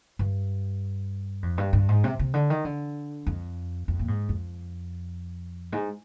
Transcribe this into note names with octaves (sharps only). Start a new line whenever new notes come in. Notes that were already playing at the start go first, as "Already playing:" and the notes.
G2
F2
G2
G2
G#2
C3
C3
D3
D#3
D3
F2
F2
A#2
G#2
F2
G#2